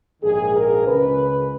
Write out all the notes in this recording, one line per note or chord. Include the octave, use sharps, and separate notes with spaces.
A#1 G#2 D#3 A#3 G#4
A#4
C#2 C#3 G#3 C#4 B4